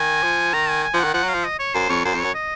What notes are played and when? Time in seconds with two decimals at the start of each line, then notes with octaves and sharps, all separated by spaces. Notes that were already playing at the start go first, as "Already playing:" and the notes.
Already playing: D#3 G#5
0.23 F3
0.54 D#3 A#5
0.69 G#5
0.84 G#5
0.94 F3
0.99 F#5
1.04 D#3
1.14 F3 F#5
1.23 F#3
1.29 F5
1.34 F3
1.45 D#5
1.59 C#5
1.74 F#2 C5
1.89 F2 C#5
2.05 F#2 C5
2.14 F2
2.20 F#2 C#5
2.35 D#5